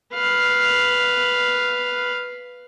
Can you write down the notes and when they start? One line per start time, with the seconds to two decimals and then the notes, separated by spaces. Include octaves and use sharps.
0.13 B4 F5